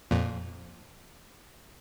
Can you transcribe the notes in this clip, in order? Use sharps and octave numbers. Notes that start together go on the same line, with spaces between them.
F2 A#2